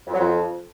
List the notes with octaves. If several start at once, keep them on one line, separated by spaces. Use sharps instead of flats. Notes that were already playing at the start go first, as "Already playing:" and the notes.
F2
F#3
F2